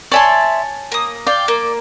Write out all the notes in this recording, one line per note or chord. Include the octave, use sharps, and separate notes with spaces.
C#5 D5 E5 G#5 A5 C6
A#3 D#6
D5 F5 G5
A#3